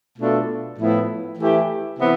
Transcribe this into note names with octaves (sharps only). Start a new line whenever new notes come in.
B2 A3 D4 F4 A4
A2 F3 B3 E4
E3 A3 E4 G4
C3 E3 B3